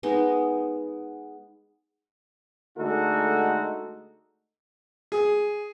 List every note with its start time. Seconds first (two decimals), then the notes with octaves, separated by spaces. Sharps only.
0.03 G#3 B3 D#4
2.76 D3 G#3 A3 D#4 F#4 A4
5.12 G#4